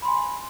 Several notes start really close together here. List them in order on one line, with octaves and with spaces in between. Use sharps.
B5 C6 G#5